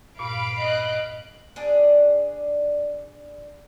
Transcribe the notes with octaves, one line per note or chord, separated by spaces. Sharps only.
G2 A#2 F5 B5 D7
D#5 F#6
D4 G#4 D5